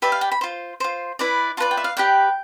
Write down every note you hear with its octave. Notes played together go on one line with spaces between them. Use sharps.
G4 B4 D5 E5
F5
G5
B5
F4 C5
F4 C5
E4 B4 D5
F4 B4 D5 A5
G5
E5
F5
G4 B4 D5 G5